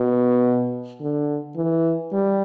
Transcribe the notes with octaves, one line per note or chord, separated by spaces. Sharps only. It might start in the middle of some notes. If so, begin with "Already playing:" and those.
Already playing: B2
D3
E3
G3